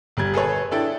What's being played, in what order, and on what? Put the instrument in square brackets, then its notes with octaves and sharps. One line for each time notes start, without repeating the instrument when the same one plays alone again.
[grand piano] G1 G3 G#6
G#4 A4 B4 C#5
D4 E4 A4 G5